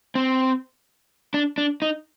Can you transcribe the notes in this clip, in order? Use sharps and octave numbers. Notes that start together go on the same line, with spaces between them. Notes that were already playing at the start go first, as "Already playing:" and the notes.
C4
D4
D4
D#4